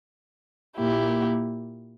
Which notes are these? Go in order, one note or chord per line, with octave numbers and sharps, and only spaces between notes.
A#2 A#3 E4 G4